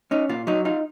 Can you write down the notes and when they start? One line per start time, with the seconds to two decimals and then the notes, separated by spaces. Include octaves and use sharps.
0.11 C#4 D#4
0.29 A#2 F4
0.47 F#3 D#4
0.65 D#4 F4